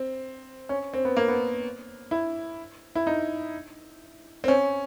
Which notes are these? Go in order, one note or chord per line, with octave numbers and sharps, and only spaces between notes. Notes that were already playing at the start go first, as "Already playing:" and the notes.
Already playing: C4
C#4
C4
B3
A#3
B3
E4
E4
D#4
C4
C#4